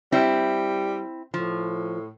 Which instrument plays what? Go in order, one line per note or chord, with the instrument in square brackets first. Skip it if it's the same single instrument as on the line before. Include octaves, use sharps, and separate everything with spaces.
[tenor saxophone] G3 [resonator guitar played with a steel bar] C4 E4
[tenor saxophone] A2 [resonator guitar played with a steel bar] F3